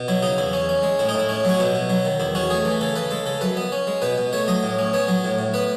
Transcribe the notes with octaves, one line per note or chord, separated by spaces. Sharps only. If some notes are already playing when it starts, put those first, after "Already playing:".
Already playing: B2
F#3 E4
C#3 D#4
E2 E4
C#4
C#4
G#3
A2 E4
D#4
A2 E4
C#4
F#3 F#4
B2 E4
B2
F#3
D#3
E2 E4
C#4 F#4
A3 G#4
E3
C#3 A4
C#3 B4
G#3 A4
C#3 A4
F#2 B4
B3
C#4
G#3
B2 B4
B2
A3 C#5
F#3 D#5
A2
C#4
B3 C#5
F#3
A2
A2
B3 B4